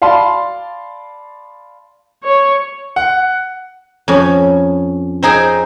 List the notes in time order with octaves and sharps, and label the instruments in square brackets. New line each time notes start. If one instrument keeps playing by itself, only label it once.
[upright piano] D5 F5 A5 B5 C6
[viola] C#5
[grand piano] F#5
[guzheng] F2 C#4
C4 D#4 G#4 G5